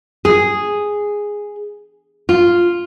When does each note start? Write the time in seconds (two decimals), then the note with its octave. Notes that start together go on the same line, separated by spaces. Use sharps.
0.25 G#4
2.29 F4